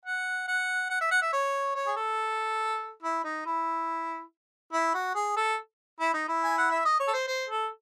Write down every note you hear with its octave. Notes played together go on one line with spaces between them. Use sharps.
F#5
F#5
F#5
E5
F#5
E5
C#5
C#5
G#4
A4
E4
D#4
E4
E4
F#4
G#4
A4
E4
D#4
E4
G#5
F#5
E5
D#5
C#5
A4
C5
C5
A4